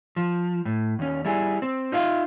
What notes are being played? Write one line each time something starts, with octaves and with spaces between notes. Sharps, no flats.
F3
A2
D#2 C#4
G3 E4 G#4
C4
D#4 F4 E5 F5